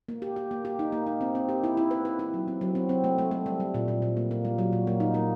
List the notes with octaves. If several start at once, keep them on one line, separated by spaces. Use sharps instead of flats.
A#3
G4
G4
A#3
G4
D#4
A#3
D#4
C4
C4
G4
E4
E4
B4
B4
E4
F#3
C4
F#3
C4
C4
A3
A3
A3
G3
G3
A#2
A#2
A#2
A#3
A#3
G3
F#3
A#2
A#3
D#4
A#3